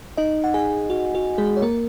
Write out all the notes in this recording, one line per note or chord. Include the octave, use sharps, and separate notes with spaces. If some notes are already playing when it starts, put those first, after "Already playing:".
D#4 D#5
F#5
G#4 G#5
F#4
F#4
G#3 G#4
C#5
A#3 A#4